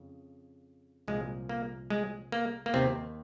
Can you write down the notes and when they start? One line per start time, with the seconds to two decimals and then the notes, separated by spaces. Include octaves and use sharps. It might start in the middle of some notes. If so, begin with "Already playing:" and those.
Already playing: F2 C#3
1.08 C2 A#2 F3 G#3
1.49 A#3
1.90 G#3
2.32 A#3
2.66 A#3
2.74 D#2 C3 D#3 C4